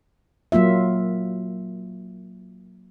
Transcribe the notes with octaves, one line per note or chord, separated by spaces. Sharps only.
F#3 A#3 F4 E5